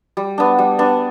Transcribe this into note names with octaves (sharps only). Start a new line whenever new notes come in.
G3
B3 D4
G3
B3 D4